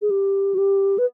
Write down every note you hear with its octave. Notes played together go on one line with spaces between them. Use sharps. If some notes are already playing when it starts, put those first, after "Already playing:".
G#4
G4
F#4
G4
B4